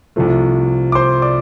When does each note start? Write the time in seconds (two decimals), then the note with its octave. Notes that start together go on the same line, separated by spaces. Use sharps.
0.16 C2 C3 F3 A3
0.92 D6
0.95 C5 C6
1.22 D5 D6